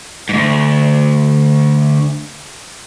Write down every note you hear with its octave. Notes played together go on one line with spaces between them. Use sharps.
D2 G#2